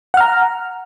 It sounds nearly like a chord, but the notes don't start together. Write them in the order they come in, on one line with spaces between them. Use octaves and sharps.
F#5 F6 A#5